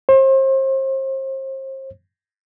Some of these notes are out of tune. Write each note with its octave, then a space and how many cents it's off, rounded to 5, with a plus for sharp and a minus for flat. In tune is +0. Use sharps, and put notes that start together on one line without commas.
C5 +35